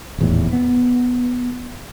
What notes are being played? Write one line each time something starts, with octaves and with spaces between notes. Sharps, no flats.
D#1 E2 A2
B3